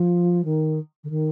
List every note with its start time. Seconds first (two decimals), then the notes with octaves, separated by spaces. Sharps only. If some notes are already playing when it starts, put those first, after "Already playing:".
Already playing: F3
0.44 D#3
1.04 D3
1.10 D#3